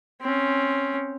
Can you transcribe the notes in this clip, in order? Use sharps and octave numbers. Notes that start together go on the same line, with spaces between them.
C4 C#4